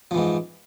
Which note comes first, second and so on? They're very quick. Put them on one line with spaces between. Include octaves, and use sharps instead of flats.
F3 E3 G#2